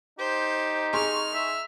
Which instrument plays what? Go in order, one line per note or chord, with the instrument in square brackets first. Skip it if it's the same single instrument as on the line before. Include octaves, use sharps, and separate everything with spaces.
[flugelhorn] D#4 [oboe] G4 [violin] C5
[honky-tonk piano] G#4 C6 C#6 [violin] F6
[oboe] E5